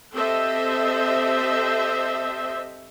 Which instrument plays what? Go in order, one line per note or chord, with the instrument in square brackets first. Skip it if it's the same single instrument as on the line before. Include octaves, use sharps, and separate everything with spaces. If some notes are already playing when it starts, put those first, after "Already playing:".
[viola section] C4 G4 A4 C5 D#5 E5